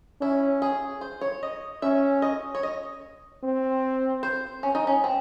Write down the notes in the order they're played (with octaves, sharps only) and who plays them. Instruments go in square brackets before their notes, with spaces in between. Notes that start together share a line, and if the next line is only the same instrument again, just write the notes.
[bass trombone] C#4 [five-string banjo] E4
[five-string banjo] G#4
C5
C#5
D#5
[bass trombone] C#4 [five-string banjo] E5
[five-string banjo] D#5
C#5
D#5
[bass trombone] C4
[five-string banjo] C5
C#4
D#4
C#4
C4